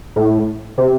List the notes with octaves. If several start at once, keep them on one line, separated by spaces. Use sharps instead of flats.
A2
C3